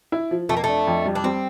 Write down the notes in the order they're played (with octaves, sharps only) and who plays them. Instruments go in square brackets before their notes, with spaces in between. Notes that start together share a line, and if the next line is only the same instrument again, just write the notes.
[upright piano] E4
F3
[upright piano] F2 [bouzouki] A3
[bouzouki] A#3
[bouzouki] A3 [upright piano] D4
[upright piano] F2
G3
[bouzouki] D4
[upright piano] G3 [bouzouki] C4